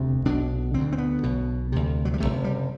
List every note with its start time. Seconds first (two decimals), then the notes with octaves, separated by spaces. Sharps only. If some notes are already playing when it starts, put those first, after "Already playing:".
Already playing: E1 D2 C3
0.25 B1 B2 D4
0.74 D3 C4
0.78 D2
0.92 C4
0.98 B3
1.23 B1 B2
1.72 D2 C3
2.05 F#3
2.14 G3
2.20 E2 C3 A3
2.24 F#1
2.44 G3